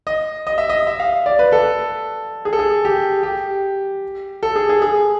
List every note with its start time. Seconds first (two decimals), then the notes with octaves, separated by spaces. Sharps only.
0.07 D#5
0.47 D#5
0.58 E5
0.69 D#5
0.87 E5
1.00 F5
1.26 D5
1.39 B4
1.52 A4
2.45 G#4
2.53 A4
2.59 G#4
2.85 G4
3.23 G4
4.43 A4
4.56 G#4
4.69 G#4
4.82 G#4